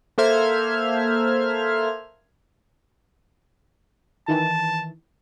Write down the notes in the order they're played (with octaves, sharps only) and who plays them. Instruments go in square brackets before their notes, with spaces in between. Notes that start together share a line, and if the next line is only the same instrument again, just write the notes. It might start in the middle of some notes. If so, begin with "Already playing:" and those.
[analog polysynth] A#3 A4 C5 E5 F6 G#6
[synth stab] D#3 E3 [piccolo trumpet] A5